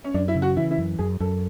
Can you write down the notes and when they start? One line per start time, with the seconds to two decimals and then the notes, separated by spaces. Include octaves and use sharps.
0.04 C#4
0.14 F#2 D4
0.28 E4
0.35 C#3
0.42 F#4
0.56 E3 E4
0.71 E4
0.78 F#2
0.99 F#2 G#4
1.20 F#2 A4